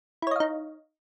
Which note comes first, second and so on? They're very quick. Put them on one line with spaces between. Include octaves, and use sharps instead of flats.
E4 C#5 D#5 F5 D#4